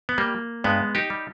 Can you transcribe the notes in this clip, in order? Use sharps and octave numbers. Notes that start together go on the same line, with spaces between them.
B3
G3 A#3
G2 G#3 B3
D#4 G4
G3